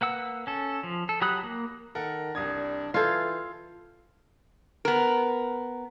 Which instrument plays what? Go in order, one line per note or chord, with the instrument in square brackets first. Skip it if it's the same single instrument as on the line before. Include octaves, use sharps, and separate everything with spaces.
[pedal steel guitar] A#3 B4 F#5 E6
C#4 A4
F3
A4
F#3 G4 B5 D#6 F#6
A#3
[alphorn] D#3 [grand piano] A4 A#4 F#5
[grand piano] C2 D#6 G#6 [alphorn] D4
[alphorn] E3 [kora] F4 A4 [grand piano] G6 G#6 C7
[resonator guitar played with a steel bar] B3 A#4